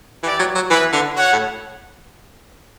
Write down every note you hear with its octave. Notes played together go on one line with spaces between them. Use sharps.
E3 E4 G4 D5
F#3
F#3
E3 B3 E4 B4
D3
F#4 C#5 F#5
A2